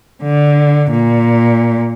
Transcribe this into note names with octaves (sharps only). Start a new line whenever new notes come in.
D3
A#2